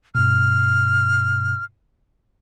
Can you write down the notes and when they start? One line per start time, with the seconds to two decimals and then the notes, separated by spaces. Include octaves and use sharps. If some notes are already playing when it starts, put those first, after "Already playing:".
0.15 G2 B2 F6